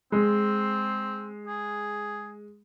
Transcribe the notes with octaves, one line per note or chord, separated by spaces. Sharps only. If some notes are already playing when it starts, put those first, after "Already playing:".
G#3 C4
G#4